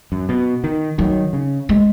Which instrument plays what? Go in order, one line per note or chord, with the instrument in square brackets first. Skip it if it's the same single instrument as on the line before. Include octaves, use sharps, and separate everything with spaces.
[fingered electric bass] F#2
B2
D#3
[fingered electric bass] D#3 [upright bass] F#3
[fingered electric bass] C#3
[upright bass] G#3